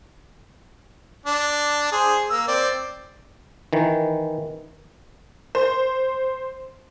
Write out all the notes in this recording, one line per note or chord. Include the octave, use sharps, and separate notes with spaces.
D4
G#4 C5
A#3 E6
C4 D5
D#3 E3
C5